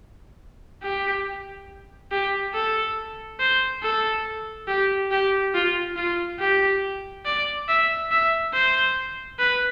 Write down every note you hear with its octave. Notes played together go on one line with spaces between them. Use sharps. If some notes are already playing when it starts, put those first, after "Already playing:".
G4
G4
A4
C5
A4
G4
G4
F4
F4
G4
D5
E5
E5
C5
B4